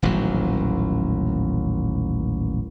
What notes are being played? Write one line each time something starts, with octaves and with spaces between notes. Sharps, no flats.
D#1 A1 D#2 F#3